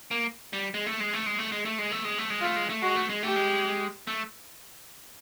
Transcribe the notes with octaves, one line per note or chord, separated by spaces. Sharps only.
A#3
G3
G#3
A3
G#3
A3
G#3
A3
G#3
A3
G#3
A3
G#3
A3
G#3
A3 F4
G#3
A3
G#3 F#4
A3
G#3
A3 G4
G#3
A3